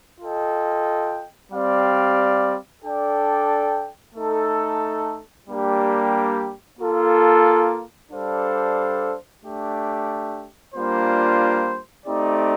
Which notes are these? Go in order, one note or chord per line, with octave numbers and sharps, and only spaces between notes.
F4 A4 D#5 G5
G3 C4 G4 D5 F5
D4 A4 D5 G5
A3 D#4 A4
G3 A#3 D4 G4
A#3 F4 A4
G3 D4 A4 C5 F5
A3 D4 G4
G3 A#3 D4 F4 C5
A3 C4 D#4 G4 D5